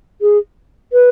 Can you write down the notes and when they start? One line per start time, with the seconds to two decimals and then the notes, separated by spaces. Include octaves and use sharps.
0.22 G#4
0.93 B4